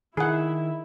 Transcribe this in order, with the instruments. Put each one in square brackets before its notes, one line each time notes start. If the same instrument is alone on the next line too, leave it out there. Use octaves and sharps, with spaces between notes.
[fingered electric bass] D#3 [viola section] E4 [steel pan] G#4 F#5